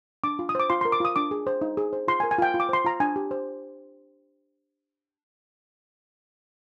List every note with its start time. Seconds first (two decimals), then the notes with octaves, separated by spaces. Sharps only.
0.24 D4 D6
0.39 F4
0.49 D#6
0.55 C5 D6
0.70 F4 C6
0.81 A#4 C6
0.92 D6
1.00 F4 D#6
1.16 D4 D6
1.31 G#4
1.47 C5
1.61 D#4
1.77 G#4
1.93 C5
2.08 F4 C6
2.20 G#5
2.23 A#4
2.31 G#5
2.38 F4 G5
2.54 F4
2.60 D6
2.69 C5 C6
2.84 F4 A#5
3.00 D4 G#5
3.16 G4
3.31 C5